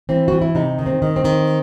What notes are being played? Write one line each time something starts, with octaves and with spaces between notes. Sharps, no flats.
E3 C4
E3 F#4
E4
C3 D#4
D#3
C4
D#3
C4
D#3